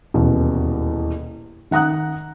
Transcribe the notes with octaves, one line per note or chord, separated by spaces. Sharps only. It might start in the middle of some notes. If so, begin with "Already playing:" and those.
D#1 E2 B2
D#3 F#5 A#5 D#6 F#6